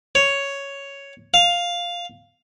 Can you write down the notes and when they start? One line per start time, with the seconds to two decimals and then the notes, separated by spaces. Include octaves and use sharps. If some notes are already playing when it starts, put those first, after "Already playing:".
0.15 C#5
1.34 F5